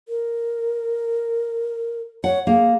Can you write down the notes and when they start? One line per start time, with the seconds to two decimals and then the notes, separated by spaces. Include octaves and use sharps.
0.08 A#4
2.24 C#5 F#5
2.47 A#3 G#4